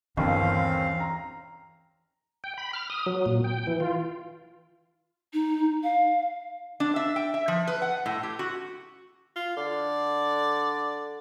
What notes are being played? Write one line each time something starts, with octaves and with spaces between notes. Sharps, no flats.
G1 D#2 E3 C4 C#4 F5
A#5
G5
B5
F6
D#6
F#3
A#2
G5
E3
F4
D#4
F5
D4
E5
G5
E5
F3
B4
F#5
A2
G4
F#4
F4
D3 D5